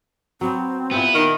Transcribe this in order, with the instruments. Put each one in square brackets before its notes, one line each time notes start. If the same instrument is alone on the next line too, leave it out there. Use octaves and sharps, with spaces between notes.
[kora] F#3 B3 [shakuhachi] C4
[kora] A#2 E4 G4 [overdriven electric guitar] B3
[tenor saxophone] D#3 [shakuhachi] D#4